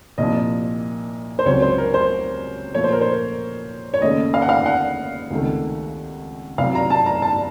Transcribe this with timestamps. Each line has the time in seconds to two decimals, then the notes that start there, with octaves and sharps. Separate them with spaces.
0.18 C2 A#2 F3 D#5
1.39 C5
1.46 C#2 C3 F#3 C#5
1.62 C5
1.78 A#4
1.94 C5
2.74 A#2 F3 A3 C#5
2.84 C5
2.93 A#4
3.01 C5
3.94 C#5
4.02 D#2 C#3 A3 D#5
4.34 F5
4.42 F#5
4.49 F5
4.66 F#5
5.30 C#2 C3 D#3 A3
6.58 C2 C3 F#3 F5
6.75 A#5
6.90 A5
7.06 A#5
7.22 A5